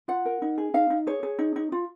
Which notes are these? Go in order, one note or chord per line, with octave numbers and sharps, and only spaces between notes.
F4 F#5
A#4
D#4
G#4
D#4 F5
D#4
G#4 C#5
G#4
D#4
D#4
F4